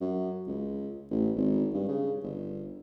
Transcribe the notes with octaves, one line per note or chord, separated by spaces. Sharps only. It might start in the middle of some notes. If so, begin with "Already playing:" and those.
F#2
C#2
A1
G#1
G2
C#3
G1